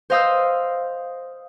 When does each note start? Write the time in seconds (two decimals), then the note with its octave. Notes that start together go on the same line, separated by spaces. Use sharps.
0.10 C5 D#5 F5 D#6 E6 G6